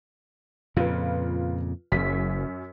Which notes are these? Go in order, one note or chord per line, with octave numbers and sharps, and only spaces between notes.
F2 A#2 C#3 F4 B4
F#1 F#2 B6